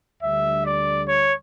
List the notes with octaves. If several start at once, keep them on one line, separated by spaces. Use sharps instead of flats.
D2 D3 G3 E5
D5
C#5